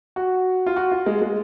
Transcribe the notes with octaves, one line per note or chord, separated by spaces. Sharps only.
F#4
F4
F#4
F4
G#3
G#3